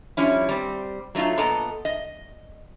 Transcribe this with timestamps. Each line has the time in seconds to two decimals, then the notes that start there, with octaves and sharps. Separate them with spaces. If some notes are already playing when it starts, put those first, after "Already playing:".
0.17 F3 G3 C#4 E4
0.49 G3 C4
1.15 F#3 A3 D#4 F4
1.37 A#2 B3 A4 D#5 A#5
1.85 D#5